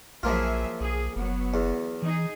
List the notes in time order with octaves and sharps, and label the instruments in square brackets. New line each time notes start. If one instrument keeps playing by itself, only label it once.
[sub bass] A#1 [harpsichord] F3 A#3 F4 [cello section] F#3 G#4 E5
[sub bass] B1 [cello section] G#4
[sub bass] F#1 [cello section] F#3 B3
[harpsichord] E2
[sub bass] E3 [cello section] D#4 G#4